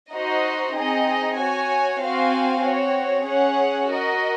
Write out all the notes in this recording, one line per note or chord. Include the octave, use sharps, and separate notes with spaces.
D#4 F#4 C5 D#5
C4 D#4 G#4 D#5
F#4 C#5 G#5
C4 F#4 C5 F5 G#5
C4 F#4 C#5
C#4 G#4 C#5 F#5
F#4 A#4 D#5